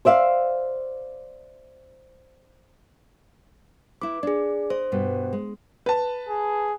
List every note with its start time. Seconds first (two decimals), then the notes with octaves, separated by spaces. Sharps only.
0.05 C5 D5 E5 F5
4.01 E4 B4 D6
4.23 D4 G#4 D5
4.70 C5 D#5
4.92 G2 B2
5.33 G#3
5.86 B4 A5
6.29 G#4